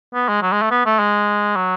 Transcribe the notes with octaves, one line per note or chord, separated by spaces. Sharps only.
B3
G#3
F#3
G#3
A3
B3
A3
G#3
F#3